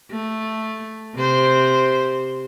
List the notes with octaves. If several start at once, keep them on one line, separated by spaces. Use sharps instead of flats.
A3
C3 C5